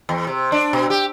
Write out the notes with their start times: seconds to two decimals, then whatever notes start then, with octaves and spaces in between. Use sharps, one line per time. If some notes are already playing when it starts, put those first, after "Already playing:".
0.09 E2
0.27 C3
0.52 D4
0.73 B2
0.90 G4